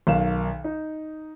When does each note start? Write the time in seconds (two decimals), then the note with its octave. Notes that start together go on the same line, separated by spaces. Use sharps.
0.07 B1 D#3 F5 E7
0.64 D#4